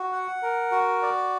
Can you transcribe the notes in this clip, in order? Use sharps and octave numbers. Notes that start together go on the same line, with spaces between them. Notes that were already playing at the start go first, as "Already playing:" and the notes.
Already playing: F#4
F#5
A#4
F#4
D5